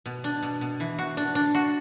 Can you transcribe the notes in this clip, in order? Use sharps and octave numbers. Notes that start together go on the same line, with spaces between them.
B2
D4
B2
B2
E3
F#4
D4
D4
F#4